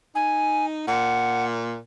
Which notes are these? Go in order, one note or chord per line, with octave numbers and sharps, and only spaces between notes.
D#4 G#5
A#2 F#5